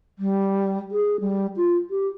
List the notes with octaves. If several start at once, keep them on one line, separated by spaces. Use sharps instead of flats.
G3
G#4
G3
F4
G4